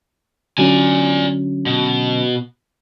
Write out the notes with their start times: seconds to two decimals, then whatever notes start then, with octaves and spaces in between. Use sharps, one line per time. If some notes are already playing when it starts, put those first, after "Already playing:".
0.58 D3 F#3 C#4 D5 G#5
1.66 B2